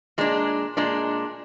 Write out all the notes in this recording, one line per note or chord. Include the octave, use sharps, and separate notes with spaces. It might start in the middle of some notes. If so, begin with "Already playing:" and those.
A#2 G#3 D4
A#2 G#3 D4